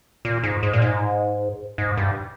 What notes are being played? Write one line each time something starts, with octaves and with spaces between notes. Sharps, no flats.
A#2
G#2
G#2
A#2
G#2
G#2
G2